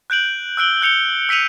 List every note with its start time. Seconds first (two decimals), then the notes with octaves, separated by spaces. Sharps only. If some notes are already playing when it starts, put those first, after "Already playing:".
0.10 F#6 G6 D7 F#7
0.57 E6 F#6 D7 G7
0.81 F#6 G6 C#7 F7 G7
1.29 E6 B6 C#7 D#7 F7